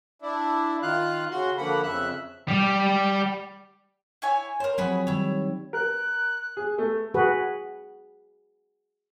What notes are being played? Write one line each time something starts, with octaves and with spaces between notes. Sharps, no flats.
D4 E4
D#3 F4 F5 F#6
C#3 F#4 C6
D3 F3 A#3 F#5 B5
F2 C#3 E5 F#6
G3 G4
E4 C#5 G#5
A#4 C5 C#5
F3 F#3 C4 F#4 G#4 B5
D#3 G3 E4 C#5
A#4 F#6
G#4
A3
F#4 G#4 B4